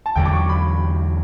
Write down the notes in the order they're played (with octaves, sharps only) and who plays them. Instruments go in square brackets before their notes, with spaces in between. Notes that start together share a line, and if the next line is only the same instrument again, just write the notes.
[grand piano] A5
[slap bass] E2 D3 F#3 [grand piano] G5
[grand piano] D6
C#6
B5